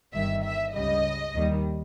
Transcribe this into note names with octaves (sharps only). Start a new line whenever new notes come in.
G1 G2 D#3 E5
E5
C#2 C#3 G3 D#5
D#2 D#3 G3